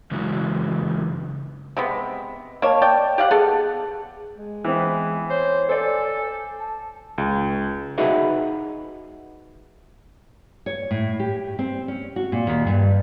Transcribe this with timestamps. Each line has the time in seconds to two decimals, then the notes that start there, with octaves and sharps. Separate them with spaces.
0.11 C#3 E3 F#3 G#3
1.77 C3 G#3 B3
2.62 A#3 C#5 D#5 A5
2.82 D5 G5
3.18 G4 F5 F#5
3.31 B3 G#4 A4
4.38 G#3
4.64 E3 B3 C4
5.30 C5 C#5
5.69 A4 C5 D5 G#5
6.59 A5
7.18 C#2
7.98 D#4 F#4 G#4 B4 D#5 E5
10.66 C#5
10.91 A2
11.20 G4
11.59 C4
11.88 C#4
12.16 F#4
12.32 A#2
12.47 D#2
12.67 G2